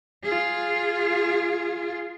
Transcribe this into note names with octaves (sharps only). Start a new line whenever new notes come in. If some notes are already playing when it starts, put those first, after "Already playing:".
F4 G#4